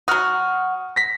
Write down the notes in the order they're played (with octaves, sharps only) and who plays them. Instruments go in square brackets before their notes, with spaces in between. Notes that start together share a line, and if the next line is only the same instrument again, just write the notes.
[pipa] F#3 F#4 [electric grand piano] D#6 F6
[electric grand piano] A#6 B6